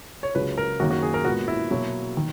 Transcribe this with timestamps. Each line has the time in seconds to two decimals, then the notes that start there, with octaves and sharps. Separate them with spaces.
0.23 C#5
0.35 C#2 C#3 F#3 B4
0.58 A#4
0.80 F#2 D#3 A#3 F#4
0.91 F#4
1.02 G#4
1.14 A#4
1.25 A#2 G#3 B3 F#4
1.48 E4
1.70 B2 F#3 A#3
2.17 D#3